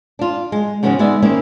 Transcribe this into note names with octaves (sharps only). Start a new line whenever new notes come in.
D4 F4
G#3
G#2 C#3 E3 B3 C#4 F#4
G#3 B3 D#4 B4 D5 E5
D#3 A#3 C4 C#4 E4